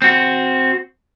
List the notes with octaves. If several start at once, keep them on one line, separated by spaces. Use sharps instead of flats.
C4 F#4